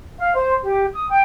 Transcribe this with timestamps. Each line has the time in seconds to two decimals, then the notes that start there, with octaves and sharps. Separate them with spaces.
0.18 F5
0.34 C5
0.62 G4
0.92 D#6
1.09 G5